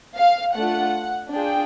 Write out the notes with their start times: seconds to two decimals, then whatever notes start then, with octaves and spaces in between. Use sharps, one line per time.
0.17 F5
0.56 A3 D4 F4 F#5
1.33 D4 F4 G#4 G5